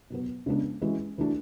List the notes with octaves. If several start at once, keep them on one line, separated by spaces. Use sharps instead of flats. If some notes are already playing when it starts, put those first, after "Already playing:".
B2 F#3 B3
C#3 G#3 B3 D4
E3 G#3 C#4 F#4
E3 A3 D4 F#4